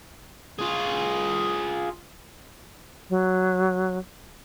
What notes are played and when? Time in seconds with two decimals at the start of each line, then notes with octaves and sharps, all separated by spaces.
0.59 F4 G#4
3.10 F#3